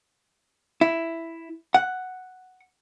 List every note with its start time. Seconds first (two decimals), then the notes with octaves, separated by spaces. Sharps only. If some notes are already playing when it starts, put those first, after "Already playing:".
0.81 E4
1.74 F#5